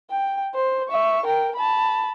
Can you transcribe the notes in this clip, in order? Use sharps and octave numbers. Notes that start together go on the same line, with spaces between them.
G5
C5
E5 C#6
A#4 G5
A5 B5